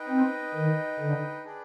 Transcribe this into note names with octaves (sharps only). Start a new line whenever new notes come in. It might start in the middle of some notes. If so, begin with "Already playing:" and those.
Already playing: D#4 B4 D#5 G5
C4
D#3
D3
D4 G#4 B4 D5 G5